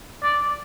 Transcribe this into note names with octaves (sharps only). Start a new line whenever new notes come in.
D5